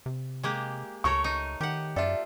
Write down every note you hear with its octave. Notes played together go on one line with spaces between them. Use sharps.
C3
G#3 A#3 G4
C#2 A3 A#4 C#5 C#6
D#4
D#3 G4 F#5
F#2 F4 A4 D5 E5